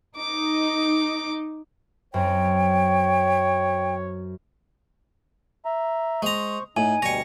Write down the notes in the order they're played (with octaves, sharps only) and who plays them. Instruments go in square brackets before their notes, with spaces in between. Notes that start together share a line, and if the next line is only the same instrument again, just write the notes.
[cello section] D#4 [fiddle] D6
[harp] F#2 C4 [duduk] C#5 [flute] G5
[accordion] E5 A#5
[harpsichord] G#3 A#5 [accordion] C5 C#6
[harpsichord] A2 [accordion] D#4 [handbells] G#5
[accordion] D2 B2 G3 [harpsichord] C#5 G#5 [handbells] A#6 C#7